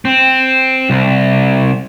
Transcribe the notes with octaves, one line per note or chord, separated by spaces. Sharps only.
C4
C2